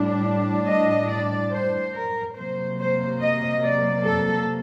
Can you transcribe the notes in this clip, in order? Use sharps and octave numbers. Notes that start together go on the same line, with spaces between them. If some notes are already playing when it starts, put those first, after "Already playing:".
Already playing: A2 G3 D4
D#5
D5
C5
A#4
C3 F#3 A#3 C5
C5
D#5
D5
A4